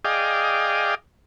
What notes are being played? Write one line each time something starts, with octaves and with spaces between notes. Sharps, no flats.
G#4 D5 D#5 F5 G5